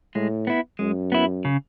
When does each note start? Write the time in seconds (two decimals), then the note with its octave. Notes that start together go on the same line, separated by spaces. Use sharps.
0.15 A2 G#3
0.47 B3 E4
0.79 F#2 G#3
1.12 B3 E4
1.45 C#3